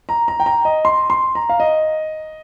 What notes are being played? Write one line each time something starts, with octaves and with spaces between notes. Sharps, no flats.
A#5
A#5
G5
A#5
D#5
C6
C6
A#5
F5
D#5